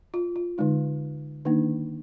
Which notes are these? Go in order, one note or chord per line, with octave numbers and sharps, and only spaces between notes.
F4
F4
D3 G#3 D#4
D#3 A#3 D4 D#4